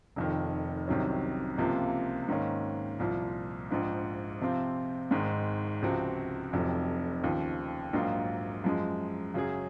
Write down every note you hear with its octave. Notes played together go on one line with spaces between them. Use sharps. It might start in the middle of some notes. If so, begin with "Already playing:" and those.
F1 F2 D#3
C2 C3 D#3 F#3 C#4
C#2 C3 F3 A#3 F4
G#2 D#3 A#3 C#4
C2 A#2 F3
A#1 G#2 F3
C3 F3 C4 F4
G#1 G#2 D#3 G#3
C#2 C3 F3 C4 F#4
F1 F2 C3 F#3
D#2 C#3 F3
A#1 G#2 F#3 A#3 F4
F#2 F3 G#3
F#2 C#3 F#3 C#4 G#4